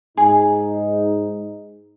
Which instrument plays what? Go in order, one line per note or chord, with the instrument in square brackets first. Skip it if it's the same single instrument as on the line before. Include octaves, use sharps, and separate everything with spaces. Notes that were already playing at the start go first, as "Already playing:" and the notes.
[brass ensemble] G#2 D#4 [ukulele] G#4